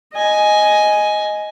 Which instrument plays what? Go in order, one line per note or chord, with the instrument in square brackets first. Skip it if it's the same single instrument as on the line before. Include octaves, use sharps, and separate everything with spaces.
[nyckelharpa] D#5 G#5